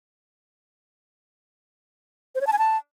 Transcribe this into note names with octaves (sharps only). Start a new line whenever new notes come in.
C5
C#5
A5
G#5
A5